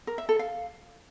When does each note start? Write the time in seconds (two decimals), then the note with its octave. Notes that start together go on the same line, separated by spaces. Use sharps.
0.07 A#4
0.18 E5
0.29 A4
0.39 F5